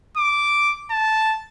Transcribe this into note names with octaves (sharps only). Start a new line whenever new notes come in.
D6
A5